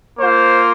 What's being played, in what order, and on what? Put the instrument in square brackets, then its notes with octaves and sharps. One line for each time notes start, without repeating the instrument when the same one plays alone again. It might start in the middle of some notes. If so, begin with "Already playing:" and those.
[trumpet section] A#3 F4 C5